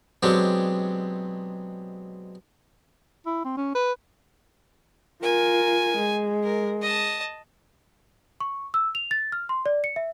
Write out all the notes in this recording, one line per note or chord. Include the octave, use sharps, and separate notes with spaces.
B2 F#3 G#3 C4 D4 G4
E4
C4
C#4
B4
F4 A#4 G#5
G#3
A#4
D#5 A5
C#6
E6
F7
A6
F6
C6
D5
C#7
E5